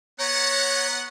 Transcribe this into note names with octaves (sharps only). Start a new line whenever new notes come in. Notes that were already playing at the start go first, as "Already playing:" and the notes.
B3 C#5 F#5 A#5